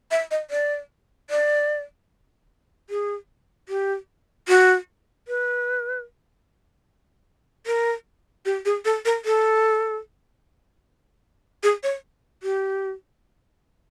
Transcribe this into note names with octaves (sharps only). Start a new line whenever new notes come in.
E5
D#5
D5
D5
G#4
G4
F#4
B4
A#4
G4
G#4
A4
A#4
A4
G#4
C#5
G4